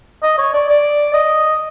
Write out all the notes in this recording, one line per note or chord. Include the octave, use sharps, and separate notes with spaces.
D#5
C#5
D5
D5
D#5